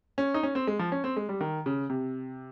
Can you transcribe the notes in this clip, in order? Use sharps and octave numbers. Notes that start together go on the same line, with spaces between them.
C#4
D#4
C#4
C4
G#3
F3
C#4
C4
G#3
G3
D#3
C#3
C3